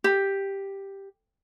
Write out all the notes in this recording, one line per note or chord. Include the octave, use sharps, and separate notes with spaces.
G4